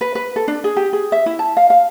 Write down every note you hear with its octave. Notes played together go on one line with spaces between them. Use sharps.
B4
B4
A4
D4
G#4
G4
G#4
E5
E4
A5
F5
F5